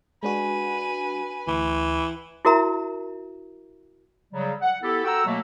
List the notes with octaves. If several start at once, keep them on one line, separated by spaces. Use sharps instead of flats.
G#3 D4 F#4 B4 G#5
D2 E3
E4 F#4 A#4 E5 A#5
C#3 F#3 G3
F#5
B3 E4 G4 A4
F#4 A4 F#5 G5 A#5 E6
B2 F#3 A3 A#3